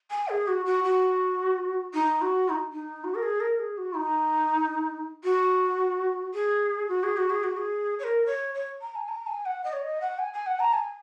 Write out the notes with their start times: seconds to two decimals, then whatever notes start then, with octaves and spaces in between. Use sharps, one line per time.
0.10 G#5
0.29 G#4
0.47 F#4
0.65 F#4
0.84 F#4
1.94 D#4
2.21 F#4
2.49 D#4
2.72 D#4
3.04 F#4
3.15 A#4
3.22 G#4
3.40 A#4
3.59 G#4
3.77 F#4
3.96 D#4
5.24 F#4
6.34 G#4
6.88 F#4
7.03 G#4
7.17 F#4
7.30 G#4
7.43 F#4
7.57 G#4
7.99 C#5
8.03 A#4
8.26 C#5
8.54 C#5
8.82 A#5
8.95 G#5
9.08 A#5
9.27 G#5
9.45 F#5
9.64 D#5
9.73 C#5
9.82 D#5
10.01 F#5
10.19 G#5
10.33 G#5
10.46 F#5
10.59 A#5
10.73 G#5